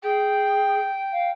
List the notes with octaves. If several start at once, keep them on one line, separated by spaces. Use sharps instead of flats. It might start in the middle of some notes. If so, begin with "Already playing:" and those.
G#4 G5
F5